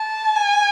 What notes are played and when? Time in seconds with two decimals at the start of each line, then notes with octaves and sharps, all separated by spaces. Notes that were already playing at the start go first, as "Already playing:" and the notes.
Already playing: A5
0.35 G#5